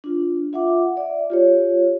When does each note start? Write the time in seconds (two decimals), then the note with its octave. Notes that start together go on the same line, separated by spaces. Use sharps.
0.04 D4 F4
0.53 F4 E5 F#5 D6
0.97 D5 E5
1.30 F4 G4 C#5